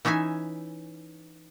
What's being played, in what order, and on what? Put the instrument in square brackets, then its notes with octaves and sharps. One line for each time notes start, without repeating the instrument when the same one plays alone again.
[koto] E3 C#4 D#4 E5 G#5